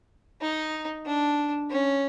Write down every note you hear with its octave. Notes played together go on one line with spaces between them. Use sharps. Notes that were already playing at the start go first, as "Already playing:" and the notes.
D#4
D4
C#4